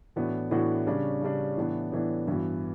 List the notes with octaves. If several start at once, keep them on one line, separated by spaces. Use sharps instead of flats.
A2 E3 B3 D4 F#4
A2 E3 B3 D4 F#4
C#3 G3 D4
C#3 G3 D4
A2 E3 B3 D4
A2 E3 B3 D4
G2 E3 B3 F#4